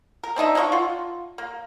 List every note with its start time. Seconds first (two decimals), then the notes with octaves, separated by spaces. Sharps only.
0.23 A#4
0.36 C4 D4 D#4 E5
0.55 A#3 D4 D#5 C#6
0.72 F4 F#5
1.38 A#3